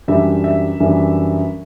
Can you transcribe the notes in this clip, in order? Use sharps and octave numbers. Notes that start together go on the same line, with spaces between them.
F#2 E3 G3 D4 E5
E5
F#2 E3 G3 D4